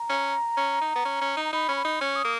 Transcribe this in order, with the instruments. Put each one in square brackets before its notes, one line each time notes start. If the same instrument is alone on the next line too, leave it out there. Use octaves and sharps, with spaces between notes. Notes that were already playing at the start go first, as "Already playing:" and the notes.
Already playing: [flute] A#5
[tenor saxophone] C#4
C#4
D#4
B3
C#4
C#4
D#4
[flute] A#5
[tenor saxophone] D#4 [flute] B5
[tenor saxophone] C#4
[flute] B5
[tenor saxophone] D#4
[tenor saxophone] C#4 [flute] C#6
[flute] D#6
[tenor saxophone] A#3